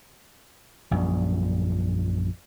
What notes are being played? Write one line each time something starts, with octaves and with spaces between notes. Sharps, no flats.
A#1 F#2 G3